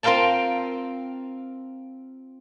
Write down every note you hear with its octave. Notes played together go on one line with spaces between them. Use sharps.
C4 F4 A#4 F5 G5 A5